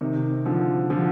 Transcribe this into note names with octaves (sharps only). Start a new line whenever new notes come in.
C3 D#3
D3 F3
D3 F3